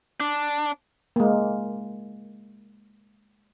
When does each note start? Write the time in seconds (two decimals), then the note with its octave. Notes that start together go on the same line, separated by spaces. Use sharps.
0.20 D4
1.16 G#3 A#3